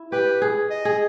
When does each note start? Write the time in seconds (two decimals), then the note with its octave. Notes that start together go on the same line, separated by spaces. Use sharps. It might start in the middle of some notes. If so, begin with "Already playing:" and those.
Already playing: E4
0.12 G4 B4
0.42 G#4
0.70 D#5
0.85 G#4